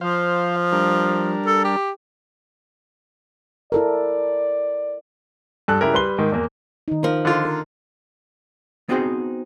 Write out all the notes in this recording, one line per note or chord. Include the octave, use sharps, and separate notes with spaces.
F3 C5 F5
G3 D4 A#4
A4
G4
E4 A4 A#4 D5
G2 A4 F#6
C#3 E4 G4 A#4
G3 B4 C6 G7
G#2 D#3
E2 A#3
D#3 D#4
F3 A#4
D3 F4
A#4
B3 C4 D#4 F#4 G#4 C5